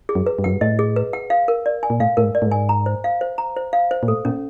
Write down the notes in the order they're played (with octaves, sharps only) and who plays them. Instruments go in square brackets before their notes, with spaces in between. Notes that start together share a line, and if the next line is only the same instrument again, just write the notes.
[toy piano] G#4
[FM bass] F#2
[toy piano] B4
[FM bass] G2
[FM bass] F#2 [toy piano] F#5
[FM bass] G2
[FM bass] A2 [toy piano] D#5
[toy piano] G#4
B4
F#5
F5
A#4
D5
G#5
[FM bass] A#2
[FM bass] A2 [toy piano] F5
[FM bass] A2 [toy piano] A#4
[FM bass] G#2
[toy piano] D5
[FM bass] A2
G#2
[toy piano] G#5
A#5
C5
F5
C5
A#5
C5
F5
C5
[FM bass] A#2
[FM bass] A2 [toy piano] A4
[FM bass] A#2 [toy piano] C#4